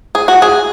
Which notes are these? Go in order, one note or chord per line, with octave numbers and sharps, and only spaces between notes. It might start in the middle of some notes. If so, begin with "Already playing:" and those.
G#4
F#4
G#4